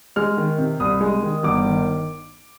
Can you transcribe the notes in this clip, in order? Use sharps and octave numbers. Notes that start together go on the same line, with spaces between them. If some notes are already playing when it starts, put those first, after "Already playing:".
G#3 F6
D#3
C3
C2 D#6
G#3
D#3
G1 D6
D#3